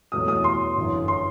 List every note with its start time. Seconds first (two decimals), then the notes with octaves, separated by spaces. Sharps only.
0.12 E2 B2 F#3 A3 D#6
0.28 D#6
0.44 C6
0.75 G1 F#2 E3
1.08 C6